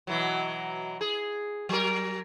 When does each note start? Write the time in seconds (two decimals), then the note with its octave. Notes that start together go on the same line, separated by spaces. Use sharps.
0.07 B2 E3 F#3
1.01 G#4
1.69 F#3 A#4